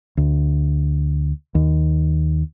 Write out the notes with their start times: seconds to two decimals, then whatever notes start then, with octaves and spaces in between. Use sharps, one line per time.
0.17 D2
1.55 D#2